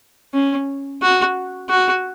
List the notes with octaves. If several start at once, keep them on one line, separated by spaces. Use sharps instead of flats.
C#4
F#4
F#4